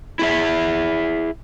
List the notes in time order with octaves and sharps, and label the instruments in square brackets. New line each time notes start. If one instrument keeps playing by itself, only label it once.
[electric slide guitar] E4 G#4 E5